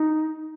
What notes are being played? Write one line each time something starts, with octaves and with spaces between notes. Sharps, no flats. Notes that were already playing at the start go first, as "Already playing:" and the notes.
Already playing: D#4